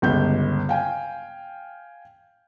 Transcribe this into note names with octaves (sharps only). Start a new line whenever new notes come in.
G1 C#2 G6
F5 G5 G#5